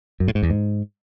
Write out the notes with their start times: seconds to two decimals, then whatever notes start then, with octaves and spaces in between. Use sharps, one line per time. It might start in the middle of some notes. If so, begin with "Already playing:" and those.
0.20 F#2
0.28 A2
0.35 G#2
0.43 E2
0.50 G#2